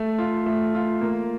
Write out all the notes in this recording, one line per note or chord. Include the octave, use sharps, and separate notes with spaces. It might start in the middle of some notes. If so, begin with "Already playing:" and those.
Already playing: A3
F4
A3
F4
A#3